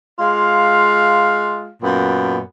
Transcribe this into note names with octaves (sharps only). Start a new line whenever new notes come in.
G#3 F4 F5
F#2 A#2 B3